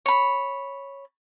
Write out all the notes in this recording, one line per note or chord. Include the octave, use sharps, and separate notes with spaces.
C#5 B5